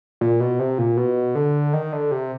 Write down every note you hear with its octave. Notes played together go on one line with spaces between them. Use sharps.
A#2
B2
C3
A#2
B2
D3
D#3
D3
C3